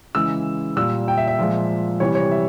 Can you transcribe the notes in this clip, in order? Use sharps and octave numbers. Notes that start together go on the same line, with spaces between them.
C#3 E3 G#3 E6
A#2 G3 E6
G5
E5
E5
A#2 F3 G#3
C3 E3 G3 C#5
C#5
E5